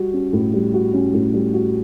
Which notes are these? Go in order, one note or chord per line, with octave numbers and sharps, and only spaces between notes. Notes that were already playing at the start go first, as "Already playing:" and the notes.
Already playing: G3 F#4
C#4
A2
G3
F#4
C#4
A2
G3
F#4